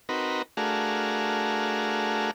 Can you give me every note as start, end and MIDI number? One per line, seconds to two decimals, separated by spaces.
0.09 0.42 60
0.09 0.42 63
0.09 0.42 66
0.09 0.42 70
0.09 0.42 71
0.57 2.31 57
0.57 2.31 62
0.57 2.31 66
0.57 2.31 68
0.57 2.31 70
0.57 2.31 77